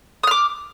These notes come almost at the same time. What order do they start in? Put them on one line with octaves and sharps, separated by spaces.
D#6 F6 D6